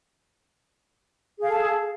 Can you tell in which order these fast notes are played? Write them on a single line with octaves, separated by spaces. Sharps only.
G#4 F5 A4 A5